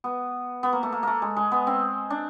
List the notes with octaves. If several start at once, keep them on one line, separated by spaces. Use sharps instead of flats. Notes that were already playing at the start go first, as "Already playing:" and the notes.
B3
B3
A#3
A3
A#3
A3 A#3
G#3
G#3
B3
C4
D4